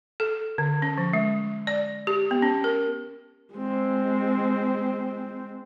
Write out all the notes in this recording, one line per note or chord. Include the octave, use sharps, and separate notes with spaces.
A4
D3
C#4
F3
G#3
D5
G4
B3
C#4
A#4
G#3 C4